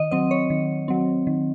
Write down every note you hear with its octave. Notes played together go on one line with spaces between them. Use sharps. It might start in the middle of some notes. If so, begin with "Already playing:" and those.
Already playing: D#3 D#5
F#3 C4 D#5
C#5
D#3
F#3 C4
D#3